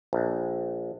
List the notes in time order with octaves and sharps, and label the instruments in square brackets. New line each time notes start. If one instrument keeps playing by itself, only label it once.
[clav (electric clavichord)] A#1